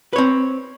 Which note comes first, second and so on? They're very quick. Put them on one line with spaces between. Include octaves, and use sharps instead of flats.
B4 C#5 C4